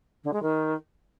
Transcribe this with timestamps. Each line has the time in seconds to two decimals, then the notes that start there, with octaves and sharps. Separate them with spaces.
0.23 D3
0.33 G#3
0.42 D#3